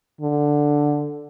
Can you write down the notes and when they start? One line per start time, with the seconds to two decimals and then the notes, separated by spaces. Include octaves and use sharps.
0.21 D3